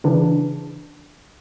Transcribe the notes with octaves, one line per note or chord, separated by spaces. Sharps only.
C#3 E3 D4